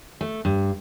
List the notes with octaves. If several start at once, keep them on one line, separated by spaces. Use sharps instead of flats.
A3
G2